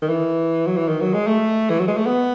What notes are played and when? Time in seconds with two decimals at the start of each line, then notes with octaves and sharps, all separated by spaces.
0.02 D#3
0.09 E3
0.67 F#3
0.77 E3
0.88 D#3
1.01 F#3
1.14 G#3
1.28 A3
1.70 E3
1.80 F#3
1.88 G#3
1.97 A3
2.06 B3